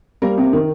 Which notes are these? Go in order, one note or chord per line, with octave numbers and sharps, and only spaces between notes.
G3 A#3 A#4
C3
D#3